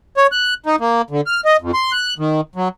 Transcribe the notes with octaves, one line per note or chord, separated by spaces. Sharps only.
C#5
F#6
D#4
A#3
D3
F6
D#5
F2
C6
F#6
D#3
F#3